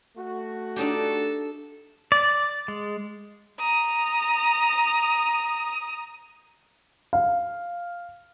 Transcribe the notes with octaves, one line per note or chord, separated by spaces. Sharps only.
A3 F#4
D4 D#4 G4 A4
D5
G#3
A#5 D#6
F5